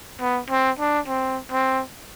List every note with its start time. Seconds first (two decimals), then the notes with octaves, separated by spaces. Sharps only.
0.21 B3
0.50 C4
0.79 D4
1.08 C4
1.52 C4